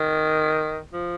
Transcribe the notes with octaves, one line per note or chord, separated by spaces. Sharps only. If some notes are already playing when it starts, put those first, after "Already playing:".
Already playing: D#3
F3